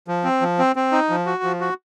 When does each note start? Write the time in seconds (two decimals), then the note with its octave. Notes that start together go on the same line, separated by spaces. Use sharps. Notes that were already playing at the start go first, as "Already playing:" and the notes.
0.08 F3
0.24 C4
0.41 F3
0.59 C4
0.76 C4
0.92 D#4
1.10 F3
1.26 F#4
1.43 F3
1.61 F#4